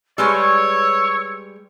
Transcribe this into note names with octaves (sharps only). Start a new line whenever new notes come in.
G3 G#3 B4 C#5 E6